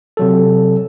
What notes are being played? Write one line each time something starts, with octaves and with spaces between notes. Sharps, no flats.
C3 F#3 A4